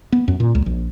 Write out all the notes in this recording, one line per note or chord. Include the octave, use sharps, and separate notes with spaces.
B3
F#2
A#2
C#2
A#1